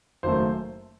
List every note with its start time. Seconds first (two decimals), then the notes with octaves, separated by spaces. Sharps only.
0.23 F#1 F#2 D#3 A3 C5